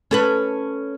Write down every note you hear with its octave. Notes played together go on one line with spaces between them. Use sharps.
C#4 A4 B4